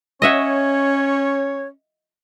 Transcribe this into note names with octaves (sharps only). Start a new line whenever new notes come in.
C#4 C#5 D#5 E5 F#5